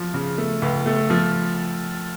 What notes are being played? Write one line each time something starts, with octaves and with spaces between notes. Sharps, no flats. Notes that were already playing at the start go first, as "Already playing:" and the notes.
Already playing: F3
C#3
A3
C#2
A3
F3